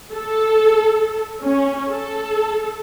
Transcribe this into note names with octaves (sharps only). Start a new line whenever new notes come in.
A4
C#4
A4